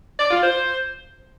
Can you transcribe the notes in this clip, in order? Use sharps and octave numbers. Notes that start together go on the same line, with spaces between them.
D5
F4
C5